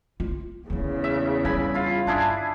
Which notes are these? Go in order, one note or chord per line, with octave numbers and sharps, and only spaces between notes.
F4
E2 C#3 A3 A#3
E5
G3 G#5 B5
E4 F4
G1 D4 E4 G#4